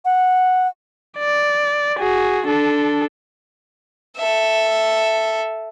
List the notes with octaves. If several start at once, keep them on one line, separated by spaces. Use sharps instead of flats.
F#5
D5
F#4 G#4
D4 A4
A4 E5